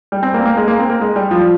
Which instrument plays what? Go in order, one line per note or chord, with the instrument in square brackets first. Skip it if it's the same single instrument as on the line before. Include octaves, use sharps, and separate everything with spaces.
[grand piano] G3
C4
A#3
C4
A#3
G#3
A#3
C4
A#3
G#3
G3
F3